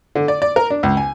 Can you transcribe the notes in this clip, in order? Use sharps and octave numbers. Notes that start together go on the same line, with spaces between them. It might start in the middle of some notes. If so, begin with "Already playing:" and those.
D3
D5
D5
A#4
D4
C#2
G#5